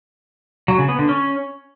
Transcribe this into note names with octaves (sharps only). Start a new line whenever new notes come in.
F#3
C#3
B3
D3
C#4